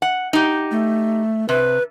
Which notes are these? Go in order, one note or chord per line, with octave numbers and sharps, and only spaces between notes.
F#5
D#4 G4
A3
C3 B4